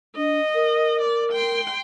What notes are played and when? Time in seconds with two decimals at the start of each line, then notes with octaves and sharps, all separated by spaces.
0.16 D4 D#5
0.55 A#4
1.02 D5
1.32 G5 C6